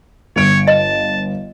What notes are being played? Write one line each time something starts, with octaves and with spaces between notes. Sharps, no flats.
G1 C#5 D7
D#5 A5